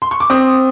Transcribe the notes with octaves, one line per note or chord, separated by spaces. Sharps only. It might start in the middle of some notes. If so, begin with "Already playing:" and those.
C6
C#6
D6
C4 D#6